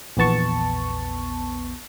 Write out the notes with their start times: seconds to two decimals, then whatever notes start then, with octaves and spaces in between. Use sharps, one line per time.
0.17 A#1 E2 B3 A5 C#6